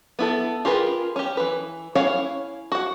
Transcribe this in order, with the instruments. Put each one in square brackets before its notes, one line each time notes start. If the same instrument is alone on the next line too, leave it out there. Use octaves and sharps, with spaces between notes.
[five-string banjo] B3 E4 A4
F4 G4 G#4 A#4 B4
C#4 G4
E3 B4
C#4 E4 C#5 F5 F#5
F#4 F#5